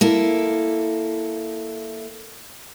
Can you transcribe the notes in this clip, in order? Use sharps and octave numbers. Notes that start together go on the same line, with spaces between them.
A#3 E4 A4